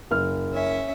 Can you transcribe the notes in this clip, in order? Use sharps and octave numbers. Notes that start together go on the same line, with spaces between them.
F#1 F6
C#4 E5